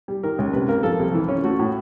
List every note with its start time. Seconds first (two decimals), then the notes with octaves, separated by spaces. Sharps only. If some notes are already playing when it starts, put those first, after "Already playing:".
0.08 G3
0.23 D#3 A#4
0.38 C#2
0.53 C3 B4
0.68 A#3 A#4
0.83 F3 A4
0.99 C2
1.14 E3
1.29 C#4
1.44 A3 F#4
1.59 A2